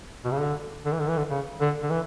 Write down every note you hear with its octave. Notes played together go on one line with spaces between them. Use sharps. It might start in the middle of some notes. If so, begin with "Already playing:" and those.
B2
C#3
D3
D3
E3
D3
E3
D3
C#3
D3
D3
E3